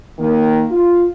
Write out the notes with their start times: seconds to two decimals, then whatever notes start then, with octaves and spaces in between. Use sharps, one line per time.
0.19 D#3 A#3
0.71 F4